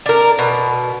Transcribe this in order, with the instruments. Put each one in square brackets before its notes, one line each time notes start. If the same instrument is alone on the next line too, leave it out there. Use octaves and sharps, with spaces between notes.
[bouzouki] D4 A#4
B2